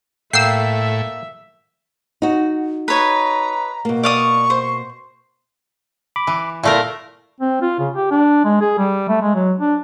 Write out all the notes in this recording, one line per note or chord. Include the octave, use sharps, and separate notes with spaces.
A2 A#3 E5 F#5 G5 E6 C7
D#4 F#4
B4 C#5 D#5 A#5
B2 A#3
D5 F5 C#6 D#6
C5
B5 D6
E3
A#2 A3 E4 A#4
C4
F4
C#3
G4
D4
G#3
G#4
G3
A3
G#3
F#3
D4